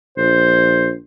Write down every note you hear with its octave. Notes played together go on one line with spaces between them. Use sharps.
A#1 C5